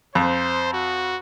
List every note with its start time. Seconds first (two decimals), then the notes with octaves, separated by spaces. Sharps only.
0.15 F2 C5
0.74 F#4